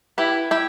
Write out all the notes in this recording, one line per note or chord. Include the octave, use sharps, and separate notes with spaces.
E4 G4 B4
E4 G4